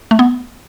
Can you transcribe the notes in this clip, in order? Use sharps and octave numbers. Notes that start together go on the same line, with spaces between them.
A3
B3